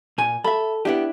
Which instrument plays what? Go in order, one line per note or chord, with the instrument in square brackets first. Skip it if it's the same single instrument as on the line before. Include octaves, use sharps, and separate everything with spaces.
[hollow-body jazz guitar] A#2 G#5
[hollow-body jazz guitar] A4 [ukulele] E5 B5
[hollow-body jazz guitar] B3 G4 [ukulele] D4 E4